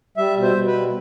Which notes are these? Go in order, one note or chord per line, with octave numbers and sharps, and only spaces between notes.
G3 E5
B2
C5
B2
B4
G3